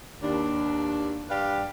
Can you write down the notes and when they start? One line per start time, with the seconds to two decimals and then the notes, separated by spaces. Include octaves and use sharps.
0.23 D#2 D4
1.30 G2 G4 B4 D5 F5